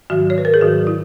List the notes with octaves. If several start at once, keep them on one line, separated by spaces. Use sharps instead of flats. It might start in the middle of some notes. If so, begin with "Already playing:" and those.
G#2 D#3 F#3 F#4
C#5
B4
A#4
G#4
G#2 D#3 F#3 F#4
E4